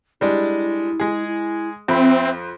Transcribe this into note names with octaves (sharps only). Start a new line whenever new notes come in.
G3 G#3 D4 E4
G#3 G#4
E4
F2 C4 E5 B5